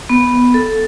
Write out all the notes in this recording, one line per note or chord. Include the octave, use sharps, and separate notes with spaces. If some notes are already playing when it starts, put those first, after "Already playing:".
B3
A4